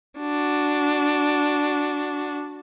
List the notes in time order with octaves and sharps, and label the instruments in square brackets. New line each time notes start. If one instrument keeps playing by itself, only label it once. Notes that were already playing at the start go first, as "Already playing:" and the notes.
[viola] D4 F#4